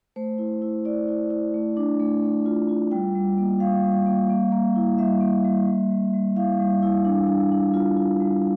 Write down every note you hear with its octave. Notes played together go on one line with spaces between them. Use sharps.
A3 C5
E4
E4
E4 D5
E4
E4
A3
D4
A3
A3
F4
F4
G3 G5
G3
A#3
G3 F5
G3
A#3
A#3
A#3
E4
G3 E5
A#3
G3
G3
G3
G3
E4 F5
G3
E4
D4
D4
D4
F4
F4
G3